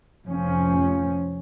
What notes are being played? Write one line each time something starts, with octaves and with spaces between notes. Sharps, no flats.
F1 F3 C#4